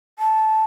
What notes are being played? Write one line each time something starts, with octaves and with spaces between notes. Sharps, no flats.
A5